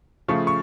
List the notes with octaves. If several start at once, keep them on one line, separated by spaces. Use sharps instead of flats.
C#3 F3 A3 C#6
C#6